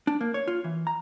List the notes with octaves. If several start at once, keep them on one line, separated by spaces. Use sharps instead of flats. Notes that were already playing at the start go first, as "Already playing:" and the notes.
D4
A#3
C#5
F4
E3
A#5